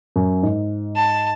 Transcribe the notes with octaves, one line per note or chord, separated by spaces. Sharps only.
F#2
G#2
A5